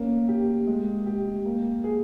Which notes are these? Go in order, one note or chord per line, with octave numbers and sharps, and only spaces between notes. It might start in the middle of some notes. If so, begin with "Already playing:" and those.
Already playing: A#3 C#4
G4
G#3
G4
A#3
G#4